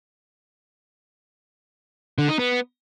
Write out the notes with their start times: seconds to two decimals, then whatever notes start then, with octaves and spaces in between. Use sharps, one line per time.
2.18 D3
2.29 D#4
2.39 B3